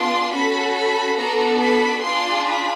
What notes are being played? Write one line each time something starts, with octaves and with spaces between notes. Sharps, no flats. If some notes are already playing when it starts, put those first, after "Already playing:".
Already playing: B3 D4 F4 G#4 C6
C#4 F#4 A4 B5
B5
B3 D4 F#4 A4 A#5
B5
D4 F4 G#4 C6
B5